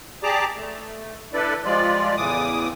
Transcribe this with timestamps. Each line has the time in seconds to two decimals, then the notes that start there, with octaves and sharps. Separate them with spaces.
0.23 G4 G#4 D5 A5 A#5 D6
0.56 A3
1.33 D4 E4 A4 B4 D5
1.64 F3 G3 G#3 F4 D5
2.17 E2 A2 C#3 E3 D6 D#6